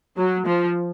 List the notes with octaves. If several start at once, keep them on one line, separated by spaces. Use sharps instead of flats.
F#3
F3